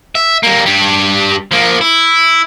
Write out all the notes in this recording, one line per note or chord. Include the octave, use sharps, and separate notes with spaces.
E5
G3 A#3
G2 G3
F3 A#3
E4